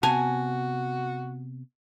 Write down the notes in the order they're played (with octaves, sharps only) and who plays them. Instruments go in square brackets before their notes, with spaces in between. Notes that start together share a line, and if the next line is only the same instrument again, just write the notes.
[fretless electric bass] C3 B3 [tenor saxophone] F#4 [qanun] G#5 [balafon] A5